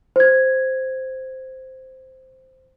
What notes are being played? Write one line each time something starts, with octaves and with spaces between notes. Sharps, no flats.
C5 G#6